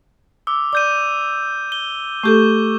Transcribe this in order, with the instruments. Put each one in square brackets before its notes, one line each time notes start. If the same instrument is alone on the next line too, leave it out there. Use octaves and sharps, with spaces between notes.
[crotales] D6 E6
[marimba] D5 [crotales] D6 G6 D#7
[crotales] G7
[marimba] A3 G4 A4 [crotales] C#6 G6 D#7